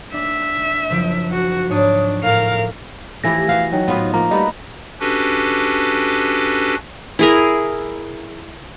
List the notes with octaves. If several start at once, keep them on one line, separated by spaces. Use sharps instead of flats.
D4 E5
F#1 F3 D7
F#4
G#2 D4 C#5 D#6
A2 A#4 F5
E3 F3 A3 E4 G4 A#6
B3 F#4 F5 F#5
D#3 F#3
A2 B3 D#4 F4 B4 C5
F3 A#3 A#5
G3 A3 B3 D#4 F#4 D#5 B5
C#4 D4 F#4 G4 A4 B4
E4 G#4 A#4